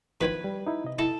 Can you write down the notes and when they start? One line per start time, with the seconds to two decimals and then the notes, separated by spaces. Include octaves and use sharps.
0.21 B2 D#3 F3 B4 C5 G#6
0.44 G3
0.67 D#4 E4
0.84 C3 D#5
0.99 E4 A4